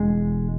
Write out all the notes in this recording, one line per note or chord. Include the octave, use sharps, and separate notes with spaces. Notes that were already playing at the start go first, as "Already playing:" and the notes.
Already playing: E1 G#3